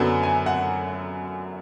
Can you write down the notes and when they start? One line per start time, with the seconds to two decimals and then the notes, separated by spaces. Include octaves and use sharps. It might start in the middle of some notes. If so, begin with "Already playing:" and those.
Already playing: F#2 D3 F#3 B3
0.23 G#5
0.46 F#5